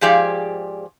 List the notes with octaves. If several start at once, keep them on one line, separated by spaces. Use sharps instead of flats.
G#2 F3 G4 G#4 D5 F5